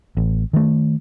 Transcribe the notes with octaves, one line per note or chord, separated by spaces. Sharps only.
A1
D#3 A3